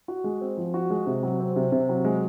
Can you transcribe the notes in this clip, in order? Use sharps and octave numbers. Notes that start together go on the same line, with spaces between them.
F#4
G#3
C4
F3
F#4
G#3
C3
F#3
C4
C3
C3
F#3
G#3